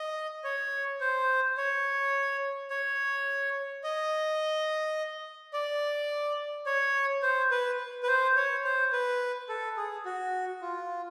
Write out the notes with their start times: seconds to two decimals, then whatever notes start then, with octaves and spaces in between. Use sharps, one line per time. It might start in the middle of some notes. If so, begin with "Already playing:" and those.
Already playing: D#5
0.44 C#5
1.00 C5
1.57 C#5
2.70 C#5
3.84 D#5
5.53 D5
6.66 C#5
7.22 C5
7.51 B4
8.03 B4
8.07 C5
8.36 C#5
8.64 C5
8.92 B4
9.49 A4
9.77 G#4
10.05 F#4
10.62 F4